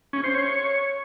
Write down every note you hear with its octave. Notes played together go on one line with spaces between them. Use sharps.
C#4
C5
C#5